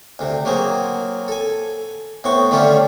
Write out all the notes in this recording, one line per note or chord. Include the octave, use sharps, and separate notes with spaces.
D2 C3
F#3 A#3 C4 G#4
A4 G#5
A2 B3 C4 C#6
D3 G3 A3 C#4 F4 G4